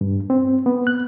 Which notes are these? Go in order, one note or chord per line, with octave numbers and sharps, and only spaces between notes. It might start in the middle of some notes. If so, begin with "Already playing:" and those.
G2
C4
B3
F#6